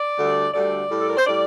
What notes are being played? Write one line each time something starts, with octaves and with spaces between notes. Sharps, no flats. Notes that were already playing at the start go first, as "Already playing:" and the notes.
Already playing: D5
D2 D3 G3
D2 D3 G3 D5
A2 G3
A4
A#4
C5
A2 G3 D5